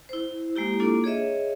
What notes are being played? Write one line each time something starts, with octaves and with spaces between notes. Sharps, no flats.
E4 C5
G#3 A#3 E4 G4
A#3 D4 F4 A4
G#4 C#5 D#5 E5